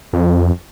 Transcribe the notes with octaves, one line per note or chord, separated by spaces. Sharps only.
F2